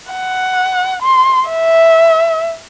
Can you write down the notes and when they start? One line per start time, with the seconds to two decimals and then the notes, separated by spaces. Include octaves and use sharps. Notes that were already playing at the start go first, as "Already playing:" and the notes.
0.12 F#5
1.02 C6
1.50 E5